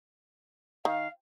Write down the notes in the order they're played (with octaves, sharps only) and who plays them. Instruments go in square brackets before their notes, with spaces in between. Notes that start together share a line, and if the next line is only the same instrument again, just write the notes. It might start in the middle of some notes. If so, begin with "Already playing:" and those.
[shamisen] D#3 [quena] F5